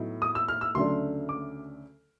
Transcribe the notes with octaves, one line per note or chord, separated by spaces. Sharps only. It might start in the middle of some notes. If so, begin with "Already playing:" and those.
Already playing: A2 F#3 B3 D#4
D#6
E6
F6
E6
D2 C#3 F#3 A3 D4 C6
D6